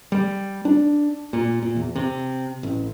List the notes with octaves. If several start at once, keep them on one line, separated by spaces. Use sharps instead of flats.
G3
D4
A#2
A#2
E2
C3
A1